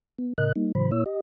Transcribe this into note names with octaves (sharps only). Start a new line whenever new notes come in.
B3
A2 C#3 A#4 D#5 F#6
G3 A#3 D#4
A2 C#3 E3 F#3 C5 B5
A#2 A#3 E4 C#5 E6
G4 D#5